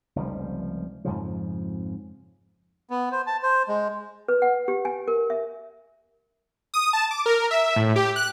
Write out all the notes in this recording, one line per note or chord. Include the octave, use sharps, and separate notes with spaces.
F1 C#2 F3 G3
F2 G#2 C#3 F3
B3
C5
A5
C5
G#3
B4
F#5
G4
G#5
A#4
E5
D#6
A5
D6
A#4
E5
A2
G4
F#6